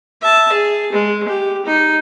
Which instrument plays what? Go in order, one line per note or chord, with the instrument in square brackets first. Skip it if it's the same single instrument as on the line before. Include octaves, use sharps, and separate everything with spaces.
[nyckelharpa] E5 A5
G#4
G#3
G4
D#4